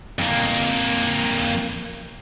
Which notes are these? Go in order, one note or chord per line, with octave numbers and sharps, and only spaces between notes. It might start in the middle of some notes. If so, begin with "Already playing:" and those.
F2 A#3